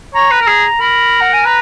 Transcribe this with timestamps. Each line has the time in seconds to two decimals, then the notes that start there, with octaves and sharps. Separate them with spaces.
0.15 C#5 A#5
0.31 B4
0.41 A#4
0.48 G#4
0.80 A#4 B5
1.21 F#5
1.33 G#5
1.46 B4 A#5